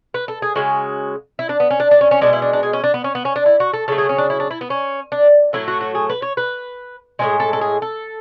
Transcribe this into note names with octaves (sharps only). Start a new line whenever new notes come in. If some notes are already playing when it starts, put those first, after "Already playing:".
B4
A4
G#4
C#3 G#3 F#4
E4
D4
B3
C#4
D4
D4
C#4
C#4
B2 G#3 D4
E4
D4
D4
G#4
C#4
D4
B3
C#4
B3
C#4
D4
E4
F#4
A4
C#3 F#3 A3 A4
G#4
C#4
D4
E4
D4
E4
B3
C#4
D4
A2 F#3 A3 E4
F#4
F#4
G#4
B4
C#5
B4
A2 E3 G#3 G#4
A4
A4
G#4
A4